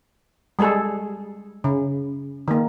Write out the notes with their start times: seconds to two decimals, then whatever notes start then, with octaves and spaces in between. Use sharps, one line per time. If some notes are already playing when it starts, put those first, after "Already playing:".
0.59 G3 G#3 G#4 A4
1.64 C#3
2.48 D#3 A#3